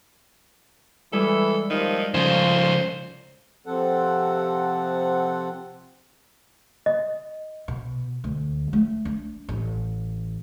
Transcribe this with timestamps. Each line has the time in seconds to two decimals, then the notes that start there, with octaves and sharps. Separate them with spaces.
1.13 E3 G3 G#3 E4 A4
1.70 D#3 F3
2.14 C#3 F3 C#4 F4 C5
3.66 C3 F3 C4 A4 F#5
6.86 D#5
7.68 B2
8.24 D2
8.73 A3
9.05 D4
9.49 A1